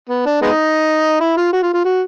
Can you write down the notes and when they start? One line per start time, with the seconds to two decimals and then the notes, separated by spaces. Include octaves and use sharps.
0.09 B3
0.26 D4
0.42 G#3 B3 D#4
1.21 E4
1.37 F4
1.53 F#4
1.63 F4
1.74 F4
1.85 F#4